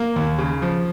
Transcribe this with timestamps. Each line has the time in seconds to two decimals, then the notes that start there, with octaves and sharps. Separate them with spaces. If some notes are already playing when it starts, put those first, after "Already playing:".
Already playing: A#3
0.16 D#2
0.38 C#3
0.62 F3